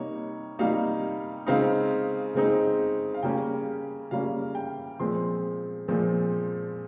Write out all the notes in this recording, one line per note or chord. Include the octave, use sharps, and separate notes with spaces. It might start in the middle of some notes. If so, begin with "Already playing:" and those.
Already playing: C3 G3 A#3 D#4 C#5
C3 G3 A#3 D#4 F5
C#3 G#3 C4 D#4 F5
C#3 G#3 C4 D#4
F5
C#3 G3 A#3 C#4 G5
C#3 G3 A#3 C#4 F5
G5
A#2 F3 G#3 C4 C6
A#2 F3 G#3 C4